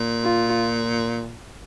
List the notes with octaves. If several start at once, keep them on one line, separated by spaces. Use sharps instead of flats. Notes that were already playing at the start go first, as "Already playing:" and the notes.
Already playing: A#2
F4